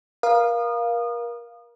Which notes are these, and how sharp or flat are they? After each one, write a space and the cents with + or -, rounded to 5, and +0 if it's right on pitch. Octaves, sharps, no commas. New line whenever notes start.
A#4 +30 F5 +0 D#6 -30